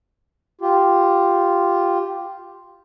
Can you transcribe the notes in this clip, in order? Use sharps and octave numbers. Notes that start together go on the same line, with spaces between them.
F4 G4